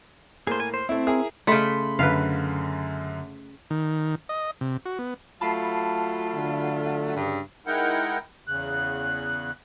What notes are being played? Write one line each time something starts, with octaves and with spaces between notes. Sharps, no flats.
A2 A#3 G#4 C5
G#5
C5
A3 C4 E4
E4 G#4 A#4
C#3 A3 B5 C6
F#2 D3 B4 F5 B6
D#3
D#5
C3
F#4
B3
F#3 A3 F4 A5 B5 C7
D3
G2 C#3
G#3 D#4 E4 A#4 F#5 G5
E2 C#3 F#6